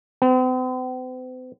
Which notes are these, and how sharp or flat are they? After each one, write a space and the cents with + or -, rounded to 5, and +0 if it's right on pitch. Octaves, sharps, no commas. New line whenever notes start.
C4 -45